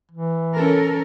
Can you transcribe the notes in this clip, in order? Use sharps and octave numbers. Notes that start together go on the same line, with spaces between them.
E3
C#4 A4 A#4